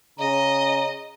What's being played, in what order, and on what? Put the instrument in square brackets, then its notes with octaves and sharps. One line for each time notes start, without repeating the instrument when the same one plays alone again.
[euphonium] C#3 [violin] D#5 [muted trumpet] A#5